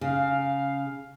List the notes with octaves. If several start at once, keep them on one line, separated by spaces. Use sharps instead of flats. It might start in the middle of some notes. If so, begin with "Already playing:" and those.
C#3 F5